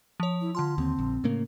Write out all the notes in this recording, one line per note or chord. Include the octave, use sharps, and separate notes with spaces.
F3 C#5
E4
D3 F4 A5 C6
D#2 C4
A#1
A2 C#3 A#3